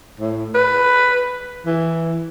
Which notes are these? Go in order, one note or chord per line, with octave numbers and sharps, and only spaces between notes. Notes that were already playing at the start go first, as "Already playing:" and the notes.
A2
B4
E3